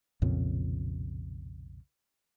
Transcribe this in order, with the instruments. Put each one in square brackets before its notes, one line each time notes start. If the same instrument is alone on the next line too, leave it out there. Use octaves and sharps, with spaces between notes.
[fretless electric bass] B1 F2 A#2 C#3